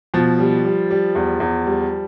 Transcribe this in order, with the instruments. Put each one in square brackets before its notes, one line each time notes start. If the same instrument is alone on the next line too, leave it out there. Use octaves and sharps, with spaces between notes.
[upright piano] B2 [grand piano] F3
[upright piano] G3
G3
G3
E2
E2
G3